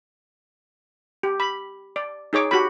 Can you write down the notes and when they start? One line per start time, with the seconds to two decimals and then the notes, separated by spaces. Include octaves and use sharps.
1.23 G4
1.40 B5
1.96 D5
2.33 D#4 G#4 C#5 D6
2.51 F#4 G4 B5